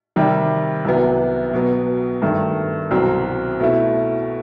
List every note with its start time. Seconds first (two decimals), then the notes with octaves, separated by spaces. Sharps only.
0.16 C3 D#3 G3
0.85 C2 C3 F#3 B3
1.53 B2 F#3 B3
2.22 G2 D#3 A3
2.91 C2 B2 F#3 C4
3.60 B2 A3 E4